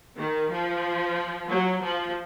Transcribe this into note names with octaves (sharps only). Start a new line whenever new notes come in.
D#3
F3
F#3
F3